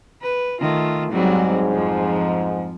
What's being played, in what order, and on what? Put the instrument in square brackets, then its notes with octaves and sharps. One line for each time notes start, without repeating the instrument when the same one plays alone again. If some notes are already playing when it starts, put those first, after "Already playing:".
[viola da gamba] B4
D#3 A3 F4
[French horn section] G#2 [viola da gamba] F#3 G3 C4
[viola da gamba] F2 F3